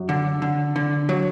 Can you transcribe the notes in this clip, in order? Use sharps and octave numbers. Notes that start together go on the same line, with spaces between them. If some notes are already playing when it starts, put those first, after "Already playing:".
Already playing: F#2
D3
D3
D3
F#3